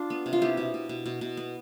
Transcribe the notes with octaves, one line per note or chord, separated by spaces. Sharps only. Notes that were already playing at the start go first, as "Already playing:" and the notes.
Already playing: D4 F4
B3
C3
F4
B3 E4 G4
B2
B2
B2
B2
B2
B3